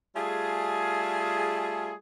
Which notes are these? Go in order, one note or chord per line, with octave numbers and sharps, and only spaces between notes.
G3 A3 F4 G#4